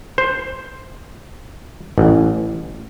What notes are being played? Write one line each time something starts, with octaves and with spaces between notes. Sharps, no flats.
C5
A1